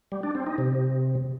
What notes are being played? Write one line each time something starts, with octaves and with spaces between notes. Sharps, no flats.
G3
D4
C4
D#4
C3